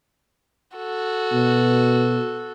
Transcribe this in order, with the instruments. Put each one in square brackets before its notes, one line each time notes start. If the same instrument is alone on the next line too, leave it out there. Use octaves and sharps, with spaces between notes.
[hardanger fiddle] F#4 A4
[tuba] B2